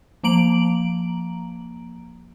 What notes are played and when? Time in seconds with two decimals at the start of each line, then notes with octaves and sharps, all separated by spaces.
0.23 F3 A#3 A#5 D7 F#7